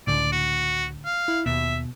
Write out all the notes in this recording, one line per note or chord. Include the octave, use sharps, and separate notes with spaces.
C#2 A2 D3 D5
F#4
F5
E4
D#2 B2 E5